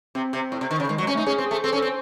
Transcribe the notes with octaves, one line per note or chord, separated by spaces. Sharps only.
C3 C4
C3
A2
C3
D#3
C#3
D#3 G#3
F#3
G#3
C#4
A3 D#4
C#4 G#4
C4
G#4
A3
C4 A4
C#4
A4
C4